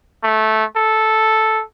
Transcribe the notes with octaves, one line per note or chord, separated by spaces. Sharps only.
A3
A4